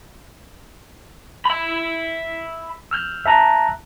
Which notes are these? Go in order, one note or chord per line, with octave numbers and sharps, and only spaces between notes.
E5 B5
E6 F6 G6
E5 A5 A#5 F#6